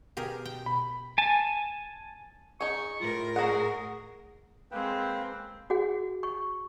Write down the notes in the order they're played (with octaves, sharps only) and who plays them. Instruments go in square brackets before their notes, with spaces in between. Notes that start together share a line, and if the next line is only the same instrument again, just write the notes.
[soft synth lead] B2 [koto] G4 G#4 A#4
[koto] G5
[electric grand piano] B5
[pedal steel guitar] G#5 A5
[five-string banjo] D#4 G#4 [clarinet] C#6
[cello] A2 A#4 [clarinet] F4
[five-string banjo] F#4 F#5 [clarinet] G#4
[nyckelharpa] G#3 C4 [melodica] A#3 B4 G5
[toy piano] F#4 G#4 F#5
C#6